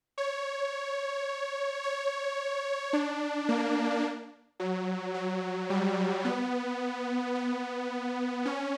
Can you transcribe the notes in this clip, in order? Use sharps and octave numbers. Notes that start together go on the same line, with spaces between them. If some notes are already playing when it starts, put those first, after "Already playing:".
C#5
C#5
D4
A#3
F#3
F#3
G3
B3
B3
C#4